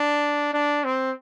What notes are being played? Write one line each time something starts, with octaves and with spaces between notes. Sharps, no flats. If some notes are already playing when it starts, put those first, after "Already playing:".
Already playing: D4
D4
C4